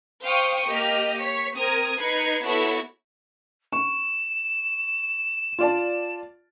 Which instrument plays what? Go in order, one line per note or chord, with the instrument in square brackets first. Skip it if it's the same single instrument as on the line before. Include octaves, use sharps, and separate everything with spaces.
[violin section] C5 F5 G5 C#6 D#6
A#3 G4 D#5 F6
C#5 B6 C#7
C4 A#4 D#6 G#6
D#4 B4 G#6 C7 C#7
B3 E4 F#4 A4 C#5 E5
[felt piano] C#6 [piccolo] E7
[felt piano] F4 D5 A5